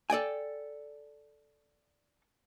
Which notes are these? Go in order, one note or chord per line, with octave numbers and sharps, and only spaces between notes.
A4 D5 G5 G#5